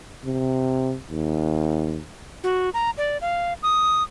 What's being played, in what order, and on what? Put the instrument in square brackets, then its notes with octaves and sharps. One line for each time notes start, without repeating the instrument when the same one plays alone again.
[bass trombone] C3
D#2
[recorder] F#4
A#5
D5
F5
D#6